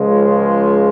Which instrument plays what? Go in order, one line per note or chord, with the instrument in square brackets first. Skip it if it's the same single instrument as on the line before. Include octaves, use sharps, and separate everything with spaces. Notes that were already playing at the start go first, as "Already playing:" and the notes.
Already playing: [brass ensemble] C#2 C#3 F3 G#3